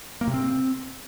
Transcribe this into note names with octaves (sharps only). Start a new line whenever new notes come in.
A#3
C3
C4